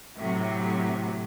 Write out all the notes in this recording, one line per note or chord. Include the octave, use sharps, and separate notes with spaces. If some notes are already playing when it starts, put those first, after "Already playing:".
A2 C3 F#3